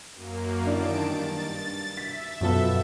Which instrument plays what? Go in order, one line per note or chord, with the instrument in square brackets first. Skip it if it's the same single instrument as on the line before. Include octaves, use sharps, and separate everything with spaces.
[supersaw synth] F#2 A#3
[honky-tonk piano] D3 D4 E4 [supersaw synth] D#3 A5 D7
[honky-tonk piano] G2 [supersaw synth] A6
[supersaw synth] E5 [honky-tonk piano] B6
[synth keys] F#2 A4 [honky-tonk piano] B2 F3 B3